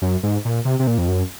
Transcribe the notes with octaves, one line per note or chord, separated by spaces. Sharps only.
F#2
G#2
A#2
C3
C3
A#2
F2
F#2